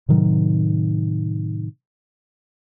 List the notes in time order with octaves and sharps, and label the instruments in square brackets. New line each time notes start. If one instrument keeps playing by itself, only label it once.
[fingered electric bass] A2 C3 D#3 F#3